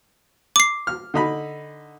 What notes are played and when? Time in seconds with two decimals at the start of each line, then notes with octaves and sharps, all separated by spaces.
0.56 D6 C7
0.87 F6
1.14 D3 D#4 B5